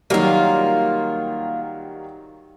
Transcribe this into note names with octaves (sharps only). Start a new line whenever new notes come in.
D#3 F#3 G3 A#3 F4